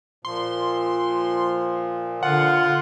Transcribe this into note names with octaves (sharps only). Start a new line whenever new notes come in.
A#2 F3 C6
D3 F4 F#5